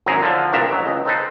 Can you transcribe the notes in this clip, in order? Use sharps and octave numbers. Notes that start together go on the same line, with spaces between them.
G#1 F#2 E4 G#4 A#5
D3 F3
C2 G2 A#2 D4 E5 A#5
A1 F#3
C#2 D#5
C4 D#4 A4 B4 C5